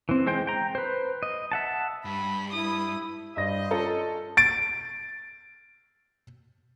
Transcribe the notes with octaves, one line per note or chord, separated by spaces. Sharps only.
E3 C4
G#3 C5 G5
G5 A#5
B4 C5
D#5
E5 F#5 A5
G2 B5
E4 D#6
G2 C5 D#5 A#6
C#4 F4 A4 A#5
A6 D7